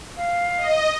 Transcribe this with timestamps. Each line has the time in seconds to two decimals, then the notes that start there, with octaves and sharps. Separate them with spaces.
0.17 F5
0.57 D#5